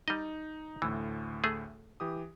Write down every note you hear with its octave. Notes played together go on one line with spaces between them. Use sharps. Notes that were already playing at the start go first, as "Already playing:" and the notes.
G3 D#4 D#5
D2 A2 E3
A3 G#4
E3 G4 D#6